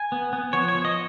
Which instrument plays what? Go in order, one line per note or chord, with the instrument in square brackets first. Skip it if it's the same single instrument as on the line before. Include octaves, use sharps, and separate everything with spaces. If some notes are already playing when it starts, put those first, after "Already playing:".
Already playing: [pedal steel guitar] G#5
B3
B3
F3 C#5
C#5
F3
D#5